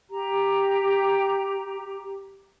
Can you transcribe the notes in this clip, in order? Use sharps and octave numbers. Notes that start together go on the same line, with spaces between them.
G4 A#5